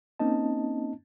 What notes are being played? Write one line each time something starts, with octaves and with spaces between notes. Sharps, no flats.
A#3 C4 C#4 D#4 D#5 A5